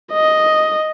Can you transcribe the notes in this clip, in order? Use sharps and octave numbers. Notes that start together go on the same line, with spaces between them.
D#5